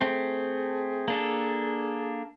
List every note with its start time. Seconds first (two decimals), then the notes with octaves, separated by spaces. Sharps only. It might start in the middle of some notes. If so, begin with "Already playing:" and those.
0.01 A3 C4 G#4
1.08 A#3 D4 A4